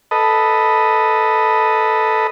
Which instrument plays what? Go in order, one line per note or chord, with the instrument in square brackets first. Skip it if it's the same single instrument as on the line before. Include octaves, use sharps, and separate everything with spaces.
[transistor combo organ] A4 B4 D#5